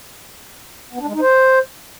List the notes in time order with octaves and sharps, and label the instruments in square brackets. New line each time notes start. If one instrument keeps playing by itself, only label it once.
[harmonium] B3
D4
G#3
D#4
C5